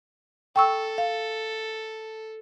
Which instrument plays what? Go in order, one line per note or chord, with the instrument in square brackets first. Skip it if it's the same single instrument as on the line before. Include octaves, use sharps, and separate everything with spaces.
[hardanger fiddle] A4 [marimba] G5 C#6 E6
[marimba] F5